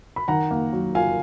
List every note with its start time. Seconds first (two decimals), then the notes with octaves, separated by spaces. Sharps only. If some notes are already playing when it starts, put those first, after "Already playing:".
0.16 B5
0.28 D#3 F#5 A#5
0.51 A#3
0.73 F#3
0.95 F4 F5 G#5